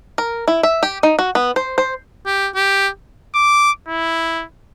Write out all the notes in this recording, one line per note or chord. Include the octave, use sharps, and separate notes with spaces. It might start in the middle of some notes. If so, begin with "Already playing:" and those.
A#4
E4
E5
G4
D#4
F#4
B3
C5
C5
G4
G4
D6
E4